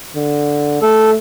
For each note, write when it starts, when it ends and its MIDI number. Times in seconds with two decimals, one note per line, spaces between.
0.16 0.77 50
0.82 1.16 57
0.82 1.11 69